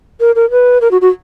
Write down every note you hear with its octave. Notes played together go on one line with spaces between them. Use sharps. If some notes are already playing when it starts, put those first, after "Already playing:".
A#4
A#4
B4
A#4
F#4
F#4